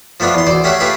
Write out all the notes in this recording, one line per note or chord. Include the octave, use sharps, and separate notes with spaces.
F3 A3 B3 D4 F4
E2 C6
D2 C5 D5
A3 C#4 G4 G#4 E5 F#5
A3 F4 G4 G#4 B4 E5